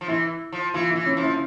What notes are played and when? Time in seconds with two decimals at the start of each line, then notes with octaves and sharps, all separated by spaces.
0.01 F3
0.08 E3 E4
0.52 F3
0.74 E3 F4
0.90 E4
0.96 E3
1.06 C#4
1.17 F3
1.23 E4